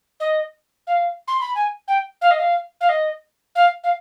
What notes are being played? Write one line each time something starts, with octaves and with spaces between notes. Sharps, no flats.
D#5
F5
C6
B5
G#5
G5
F5
D#5
F5
F5
D#5
F5
F5